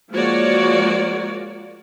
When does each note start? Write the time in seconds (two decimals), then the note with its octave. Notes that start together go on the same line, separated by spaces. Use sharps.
0.12 F3 G#3 A#3 F#4 C#5 D5